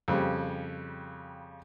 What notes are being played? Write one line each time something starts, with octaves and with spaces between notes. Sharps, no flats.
F2 C#3 G3